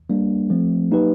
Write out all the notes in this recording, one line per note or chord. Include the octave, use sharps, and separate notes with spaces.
G3 A#3 D4
F3 A3 C4
F#3 A#3 D#4 G4 B4